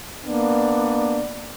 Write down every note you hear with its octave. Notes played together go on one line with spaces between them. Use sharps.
A#3 B3 D4 D5